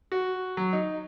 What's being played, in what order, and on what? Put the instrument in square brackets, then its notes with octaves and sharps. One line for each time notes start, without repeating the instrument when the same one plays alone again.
[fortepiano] F#4
F#3
D#4